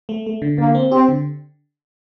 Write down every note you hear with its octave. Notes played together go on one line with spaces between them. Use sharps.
A3
A3
D3
D3 A#3
C4
C4 G4
D3